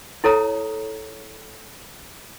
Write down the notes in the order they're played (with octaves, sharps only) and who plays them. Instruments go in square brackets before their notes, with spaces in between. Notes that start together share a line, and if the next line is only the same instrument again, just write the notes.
[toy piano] E4 A4 C#5 A#5 D#6